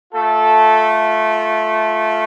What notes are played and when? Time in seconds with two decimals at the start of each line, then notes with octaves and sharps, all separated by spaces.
0.12 A3 F4 A4